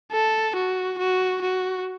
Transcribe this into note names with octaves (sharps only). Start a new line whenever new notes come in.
A4
F#4
F#4
F#4